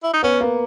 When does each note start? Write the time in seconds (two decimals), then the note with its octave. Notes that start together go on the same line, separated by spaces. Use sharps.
0.03 E4
0.13 D#4
0.23 B3 C#4
0.41 A#3